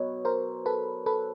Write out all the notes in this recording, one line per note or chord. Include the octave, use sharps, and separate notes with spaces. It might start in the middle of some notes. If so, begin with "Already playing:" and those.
Already playing: B2 F#3 B4 C#5 D#5
A#4 C5
A4 B4
A4 B4